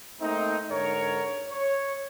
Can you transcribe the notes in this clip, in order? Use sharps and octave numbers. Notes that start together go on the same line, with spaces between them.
A3 A#3 C4 D#4
G#2 D3 A#4 C#5
C#5